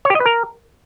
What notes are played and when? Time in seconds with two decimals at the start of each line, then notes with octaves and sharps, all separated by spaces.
0.05 C#5
0.10 G4
0.15 D#5
0.20 B4
0.26 A#4